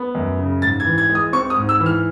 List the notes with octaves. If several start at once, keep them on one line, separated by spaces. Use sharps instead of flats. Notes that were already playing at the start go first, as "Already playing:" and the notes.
Already playing: B3
F#2
C#3
G#2 A6
G#6
E3
G#6
G#3
D#6
C4 C#6
D#6
G#2
E6
E3
F6